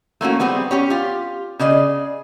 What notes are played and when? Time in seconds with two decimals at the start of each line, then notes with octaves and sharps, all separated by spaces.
0.21 A3 A#3 C#4 F#4
0.40 G3 B3 C4 G#4
0.71 C#4 G4 C#5
0.90 F4 G4
1.59 C#3 G#4 D5 D#5